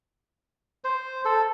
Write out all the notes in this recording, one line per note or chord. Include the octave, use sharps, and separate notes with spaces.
C5
A4